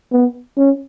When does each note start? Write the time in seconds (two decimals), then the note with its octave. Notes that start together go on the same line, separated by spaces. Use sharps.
0.12 B3
0.57 C#4